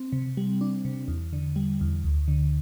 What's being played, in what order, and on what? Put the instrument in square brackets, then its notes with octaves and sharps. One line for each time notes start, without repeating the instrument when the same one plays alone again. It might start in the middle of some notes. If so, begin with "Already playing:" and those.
Already playing: [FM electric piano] C4
C3
G3
D4
C3
E2
D3
G3
E2
D2
D3